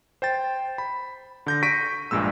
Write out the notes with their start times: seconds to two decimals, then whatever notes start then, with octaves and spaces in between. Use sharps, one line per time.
0.22 C5 G5 A6
0.78 B5
1.46 D3 G6 A#6
1.63 C#6 A#6 B6 D7 D#7
2.11 A#1 G2 A#2 G#3 E6